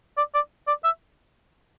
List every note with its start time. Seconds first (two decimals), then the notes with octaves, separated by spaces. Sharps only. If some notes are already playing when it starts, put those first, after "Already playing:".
0.17 D5
0.34 D5
0.67 D5
0.84 E5